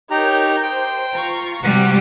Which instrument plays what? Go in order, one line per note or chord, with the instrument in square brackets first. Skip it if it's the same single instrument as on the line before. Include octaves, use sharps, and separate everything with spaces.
[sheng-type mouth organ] D#4 G4 A#5 [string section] A#4 C#5 G6
[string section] C5 [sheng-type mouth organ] G5
[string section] F4 A#5 C#6
[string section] C3 F#4 [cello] G3 [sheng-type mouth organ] F#5